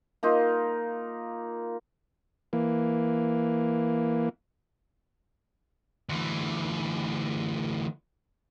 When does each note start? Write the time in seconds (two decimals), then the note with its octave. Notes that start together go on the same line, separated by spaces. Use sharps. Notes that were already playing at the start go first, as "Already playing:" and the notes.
0.23 A#3 D#4 F4
2.53 E3 A#3
6.09 D2 E3